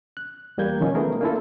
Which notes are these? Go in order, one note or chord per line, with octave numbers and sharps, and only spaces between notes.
F#6
E2 G3 A#3 G6 G#6
B2 D#3 F3 C#4
A3 B3 G#4 A#4
A#3 D4 E4 F4 A4